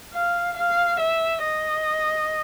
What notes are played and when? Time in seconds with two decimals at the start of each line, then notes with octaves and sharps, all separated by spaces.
0.14 F5
0.57 F5
1.00 E5
1.43 D#5